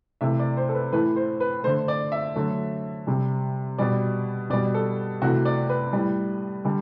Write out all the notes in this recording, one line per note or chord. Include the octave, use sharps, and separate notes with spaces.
C3 E3 A3 E5
D5
C5
A4
B4
A2 E3 A3 B4
C5
B4
D3 A3 C5
D5
E5
D3 F#3 A3
C3 G3
B2 G3 D5
B2 G3 D5
A4
C3 E3 A3 F#4
D5
B4
A2 G3
D3 G3